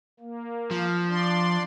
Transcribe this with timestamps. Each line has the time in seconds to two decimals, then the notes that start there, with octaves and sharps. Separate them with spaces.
0.20 A#3
0.71 F3
1.09 D4 D5 C6